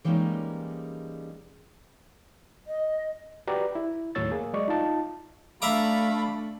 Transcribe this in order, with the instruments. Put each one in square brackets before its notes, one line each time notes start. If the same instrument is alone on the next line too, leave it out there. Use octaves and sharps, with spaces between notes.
[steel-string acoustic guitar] E3 G3 G#3 A#3 C#4 D#4
[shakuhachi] D#5
[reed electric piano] F#4 G4 B4 D5 A#5
E4
D#2 A2 F#3 C#5 E6 A6
A#3 G#4
F#3 G#3 D5 D#5 C#6
D#4 F4 A5
[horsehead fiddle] A3 D4 [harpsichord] E5 A#5 D6 [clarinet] F5 [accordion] B5